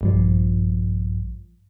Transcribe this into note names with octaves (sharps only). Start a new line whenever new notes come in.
A#1 G2 F3